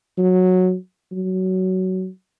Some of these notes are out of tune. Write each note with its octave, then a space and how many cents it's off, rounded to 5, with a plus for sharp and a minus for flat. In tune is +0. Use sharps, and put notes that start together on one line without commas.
F#3 -10
F#3 +15